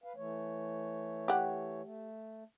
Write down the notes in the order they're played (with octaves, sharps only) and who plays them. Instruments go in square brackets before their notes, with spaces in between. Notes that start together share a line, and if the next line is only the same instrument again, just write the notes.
[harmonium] B4 F5
E3 A3 C#5
[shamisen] G4 F#5
[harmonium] A3